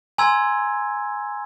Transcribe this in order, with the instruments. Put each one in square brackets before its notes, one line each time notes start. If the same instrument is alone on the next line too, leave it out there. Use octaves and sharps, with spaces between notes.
[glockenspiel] G#5 A#5 C6 E6 G#6